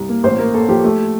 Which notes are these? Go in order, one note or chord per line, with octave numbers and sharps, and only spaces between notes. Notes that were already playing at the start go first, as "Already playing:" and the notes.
Already playing: C2
A#3
A1 C5
A#3 A#4
A#3 A4
F3 G4
A3